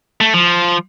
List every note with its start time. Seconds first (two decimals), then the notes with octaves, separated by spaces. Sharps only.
0.21 A3
0.34 F3